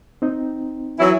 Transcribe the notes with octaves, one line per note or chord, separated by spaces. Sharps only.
C4 D#4
E3 F#3 E4